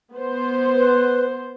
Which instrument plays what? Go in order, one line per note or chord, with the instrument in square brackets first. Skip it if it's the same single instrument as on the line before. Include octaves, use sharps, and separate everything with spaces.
[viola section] B3 C5
[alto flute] B4